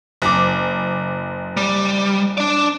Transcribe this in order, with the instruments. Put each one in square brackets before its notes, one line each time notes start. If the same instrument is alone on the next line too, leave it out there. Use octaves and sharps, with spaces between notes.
[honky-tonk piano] F#1 D6
[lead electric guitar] G3
D4 D5